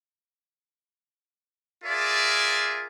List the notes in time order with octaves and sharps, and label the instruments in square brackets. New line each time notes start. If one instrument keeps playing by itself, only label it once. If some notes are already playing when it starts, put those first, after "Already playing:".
[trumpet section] F4 G#4 A#4 D5 E5